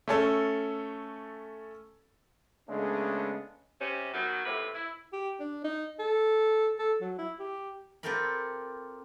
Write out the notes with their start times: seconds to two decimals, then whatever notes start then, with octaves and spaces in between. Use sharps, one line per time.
0.08 A3 C#4 A4
2.68 C#3 G#3 A3 B3 C#4 D4
3.80 C3 C#4
4.14 B2 D#3 F#3
4.45 D#2 A2 C3 B4
4.74 E4
5.13 G4
5.40 D4
5.64 D#4
5.99 A4
6.79 A4
7.01 F#3
7.18 E4
7.39 G4
8.03 C4 F4 G4 A4 A#4 B5